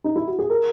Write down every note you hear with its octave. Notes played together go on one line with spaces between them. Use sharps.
D#4
E4
F#4
G#4
A#4